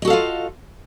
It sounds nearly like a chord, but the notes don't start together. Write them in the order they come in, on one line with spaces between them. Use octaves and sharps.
D#5 F#4 A4 F5 F4